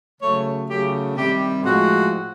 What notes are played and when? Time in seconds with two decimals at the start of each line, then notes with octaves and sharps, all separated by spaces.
0.21 C#3 F#3 A3 C#5
0.69 C#3 F#3 A3 G4
1.16 C3 D#3 G3 G4
1.64 A2 F3 G#3 F#4